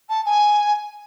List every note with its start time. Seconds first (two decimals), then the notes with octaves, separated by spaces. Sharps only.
0.09 A5
0.25 G#5